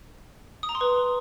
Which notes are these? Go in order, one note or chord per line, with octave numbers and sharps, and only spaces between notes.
D#6
A#5
C6
B4